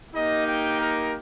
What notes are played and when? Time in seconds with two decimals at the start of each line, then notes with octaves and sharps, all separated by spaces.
0.14 A#3 D#4 G4 D#5
0.47 G5
0.80 A#4